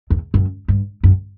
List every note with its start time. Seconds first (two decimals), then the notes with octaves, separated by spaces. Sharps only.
0.10 E2
0.34 F#2
0.68 G2
1.03 F#2